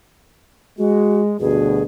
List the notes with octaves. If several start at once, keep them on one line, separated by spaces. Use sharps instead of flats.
G#3 F#4
D2 G2 B2 G#4